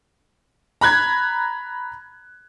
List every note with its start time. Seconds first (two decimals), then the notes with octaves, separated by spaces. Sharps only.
0.81 A#5 B5 F#6 G#6